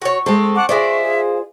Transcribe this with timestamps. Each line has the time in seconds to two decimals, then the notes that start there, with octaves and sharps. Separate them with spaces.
0.02 F#4 C#5 C#6
0.26 G#3 C4 A4
0.55 F#5 A5 D6
0.69 G#3 F4 C5 D5 E5
1.02 G#4